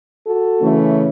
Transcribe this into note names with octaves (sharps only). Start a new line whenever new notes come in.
F#4 A4
C#3 E3 A3 C#4